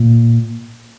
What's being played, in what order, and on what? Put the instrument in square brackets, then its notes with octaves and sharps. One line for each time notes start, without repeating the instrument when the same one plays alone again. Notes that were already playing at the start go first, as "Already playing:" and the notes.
Already playing: [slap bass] A#2